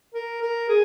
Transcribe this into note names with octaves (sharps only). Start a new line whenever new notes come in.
A#4
A#4
G#4